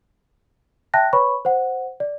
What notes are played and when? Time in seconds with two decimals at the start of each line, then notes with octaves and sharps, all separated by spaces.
0.94 E5 G5 A5 F#6 A#6
1.13 B4 C#5 B5 C#6
1.45 C5 F#5
2.00 D5